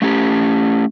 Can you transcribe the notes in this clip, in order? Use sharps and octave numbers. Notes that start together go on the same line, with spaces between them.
A3 C#4 G4